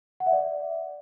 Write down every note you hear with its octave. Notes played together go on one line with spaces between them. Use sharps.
F#5
E5
D5